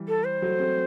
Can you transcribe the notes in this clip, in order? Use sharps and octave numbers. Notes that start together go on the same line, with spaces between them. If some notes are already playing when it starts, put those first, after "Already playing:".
Already playing: E3 G3
A4
C5
F#3 A3
A3 C4